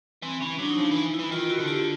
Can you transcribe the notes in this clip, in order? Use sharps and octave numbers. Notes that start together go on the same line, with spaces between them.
E3 C4
E3 C#4
F#3 D4
D#4
F3 D4
E3 D#4
E4
E3
D#3 F4
E4 F#4
D3
F4 G4